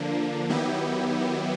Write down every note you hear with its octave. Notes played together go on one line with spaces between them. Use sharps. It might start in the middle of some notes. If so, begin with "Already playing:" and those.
Already playing: D3 F3 A#3 D4
D#3 F#3 B3 E4 G4